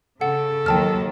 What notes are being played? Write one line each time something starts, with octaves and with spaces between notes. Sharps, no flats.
C#3 A4 F#5
D#2 D#3 F#3 G5 A5 F6